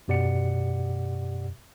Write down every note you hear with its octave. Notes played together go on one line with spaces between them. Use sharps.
F#2 B2 G4 D5 F#5 C#7